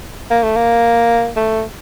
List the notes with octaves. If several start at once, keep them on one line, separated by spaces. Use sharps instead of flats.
A#3
A3
A#3
A3